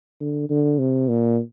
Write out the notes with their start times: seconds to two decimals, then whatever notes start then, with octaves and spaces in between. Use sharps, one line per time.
0.20 D3
0.50 D3
0.79 C3
1.09 A#2